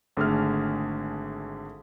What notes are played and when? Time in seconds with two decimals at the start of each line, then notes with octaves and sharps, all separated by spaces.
0.17 G#1 D3 A3 G#4 F6